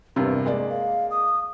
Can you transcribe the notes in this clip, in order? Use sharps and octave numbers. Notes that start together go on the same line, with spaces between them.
E2 G2 C3 A#4
G#3 A#3 D5
F5
D#6